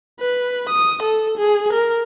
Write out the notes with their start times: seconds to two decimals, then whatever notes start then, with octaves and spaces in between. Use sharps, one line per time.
0.20 B4
0.69 D#6
1.03 A4
1.38 G#4
1.73 A#4